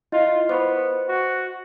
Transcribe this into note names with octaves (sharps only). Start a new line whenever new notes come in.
E4 F4 D#5
B3 C5 B5 C#6 D6
F#4